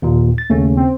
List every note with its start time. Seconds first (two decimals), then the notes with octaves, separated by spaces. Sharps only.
0.02 D#2 A#2
0.38 A6
0.50 D#2 C#3 A3 C#4
0.77 C4